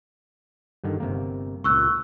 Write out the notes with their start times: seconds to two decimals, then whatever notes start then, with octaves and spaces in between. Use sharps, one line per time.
0.84 G2 D3 D#3
1.00 G1 C3 A#3
1.64 C#2 A#2 C#6 E6 F#6